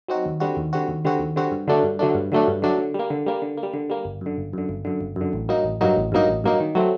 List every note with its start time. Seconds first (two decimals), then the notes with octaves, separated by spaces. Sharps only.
0.08 F#3 C4 D#4 F#4
0.25 D#2
0.40 D3 G3 C4 F#4
0.57 D#2
0.73 D3 G3 C4 F#4
0.88 D#2
1.05 D3 G3 C4 F#4
1.20 D#2
1.36 D3 G3 C4 F#4
1.52 G2
1.68 D3 F#3 A3 D4
1.83 G2
1.99 D3 F#3 A3 D4
2.15 G2
2.32 D3 F#3 A3 D4
2.48 G2
2.62 D3 F#3 A3 D4
2.78 D3
2.94 G3 A#3
3.10 D3
3.26 G3 A#3
3.42 D3
3.58 A#3
3.63 G3
3.74 D3
3.90 G3 A#3
4.05 G1
4.21 F#2 D3
4.37 G1
4.53 F#2 D3
4.69 G1
4.85 F#2 D3
5.01 G1
5.16 F#2 D3
5.33 A1
5.48 G2 F#3 A#3 D#4
5.64 A1
5.81 G2 F#3 A#3 D#4
5.97 A1
6.12 G2 F#3 A#3 D#4
6.28 A1
6.44 G2 F#3 A#3 D#4
6.60 D#3
6.75 F#3 A3 C4